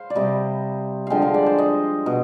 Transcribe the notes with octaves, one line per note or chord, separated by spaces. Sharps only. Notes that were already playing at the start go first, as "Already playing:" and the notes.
Already playing: C5 F5
D5
C3 G3 D#5
D3 F3 G#3 F5 G5
F5
D5
C5
D#5
B2